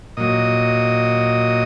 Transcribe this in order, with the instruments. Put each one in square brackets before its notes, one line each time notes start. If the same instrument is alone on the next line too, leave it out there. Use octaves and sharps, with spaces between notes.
[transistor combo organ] A#2 F#3 D#5